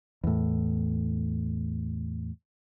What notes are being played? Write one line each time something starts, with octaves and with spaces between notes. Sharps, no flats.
E2 A2